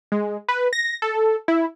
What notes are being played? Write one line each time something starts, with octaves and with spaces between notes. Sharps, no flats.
G#3
B4
A#6
A4
E4